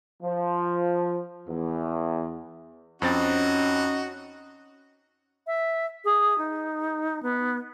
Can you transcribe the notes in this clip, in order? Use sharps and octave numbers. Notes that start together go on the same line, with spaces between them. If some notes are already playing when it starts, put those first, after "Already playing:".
F3
E2
F2 C4 C#4 D#4 F#4 A6
E5
G#4
D#4
B3